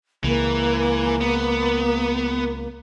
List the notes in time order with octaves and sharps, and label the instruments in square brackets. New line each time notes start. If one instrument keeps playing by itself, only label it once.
[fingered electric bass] C#2 [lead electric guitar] E3 [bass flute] A#3
[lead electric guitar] B3